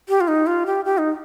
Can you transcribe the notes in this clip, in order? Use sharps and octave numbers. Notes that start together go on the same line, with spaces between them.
G4
F4
D#4
F4
G4
G4
D#4